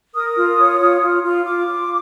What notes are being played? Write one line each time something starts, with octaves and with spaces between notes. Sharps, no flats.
A#4 D#6
F4
C#5
F4
F4
F4
F4 D6
F4